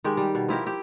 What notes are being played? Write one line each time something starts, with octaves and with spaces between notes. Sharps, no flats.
D#3 G#3 G4
G3
B2
F3 E4 G4 A#4
E4 G4